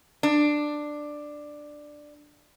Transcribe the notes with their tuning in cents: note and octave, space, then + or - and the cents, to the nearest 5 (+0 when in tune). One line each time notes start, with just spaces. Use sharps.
D4 +10